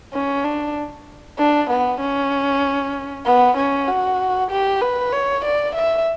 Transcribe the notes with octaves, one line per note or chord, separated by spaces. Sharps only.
C#4
D4
D4
B3
C#4
B3
C#4
F#4
G4
B4
C#5
D5
E5